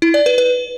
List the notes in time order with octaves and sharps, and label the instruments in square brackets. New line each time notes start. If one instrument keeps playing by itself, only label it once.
[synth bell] E4
D5
B4
B4